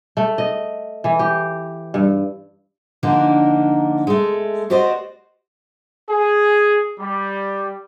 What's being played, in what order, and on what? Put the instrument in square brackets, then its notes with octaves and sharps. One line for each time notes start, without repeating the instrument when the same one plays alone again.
[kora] A3
D#5
E3
G4
G2
[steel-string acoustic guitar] D3 F3 A#3 D4 D#4 A#4
G#3 A3
F#4 G4 C5 D5 D#5
[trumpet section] G#4
G3